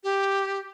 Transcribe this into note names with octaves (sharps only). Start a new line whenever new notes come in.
G4